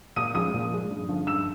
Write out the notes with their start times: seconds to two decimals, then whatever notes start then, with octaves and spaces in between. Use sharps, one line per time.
0.16 A#2 D#6 D#7
0.34 F3 G#3 D#6 D#7
0.54 A#2
0.71 F3 G#3
0.90 G2
1.09 D3 F3
1.27 G2 E6 E7